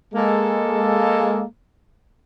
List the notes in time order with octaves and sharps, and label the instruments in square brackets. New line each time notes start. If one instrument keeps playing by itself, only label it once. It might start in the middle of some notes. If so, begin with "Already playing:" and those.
[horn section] G#3 A#3 A4